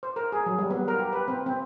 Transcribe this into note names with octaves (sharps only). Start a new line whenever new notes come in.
C5
A#4
G#4
F#3
G3
B3
A#4
G4
B4
C4
C4